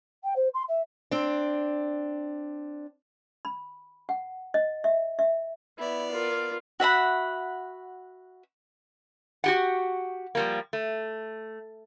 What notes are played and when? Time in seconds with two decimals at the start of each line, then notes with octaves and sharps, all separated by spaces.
0.23 G5
0.36 C5
0.54 C6
0.68 E5
1.11 C4 D4
3.45 B5
4.09 F#5
4.54 D#5
4.84 E5
5.19 E5
5.78 B3 E4 D5
6.11 F4 A#4
6.80 F#4 E5 F#5 B5
9.44 F#4 G4 F#5
10.35 F3 G3 A#3
10.73 A3